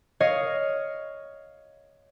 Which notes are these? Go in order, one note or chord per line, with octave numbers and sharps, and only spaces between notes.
C#5 D#5 F5